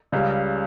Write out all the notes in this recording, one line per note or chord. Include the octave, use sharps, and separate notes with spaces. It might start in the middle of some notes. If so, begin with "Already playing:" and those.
C#2 C#3 G3